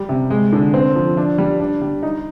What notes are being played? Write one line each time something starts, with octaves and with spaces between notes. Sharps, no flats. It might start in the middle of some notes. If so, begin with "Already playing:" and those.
Already playing: G3
C3
G#3
D3
C4
F3
D4
G3
D4
G3
D#4